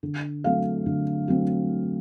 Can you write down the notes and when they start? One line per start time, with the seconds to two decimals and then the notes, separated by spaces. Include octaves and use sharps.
0.03 D3
0.44 F#3 A3 C4 F5
0.86 D3
1.28 F#3 A3 C4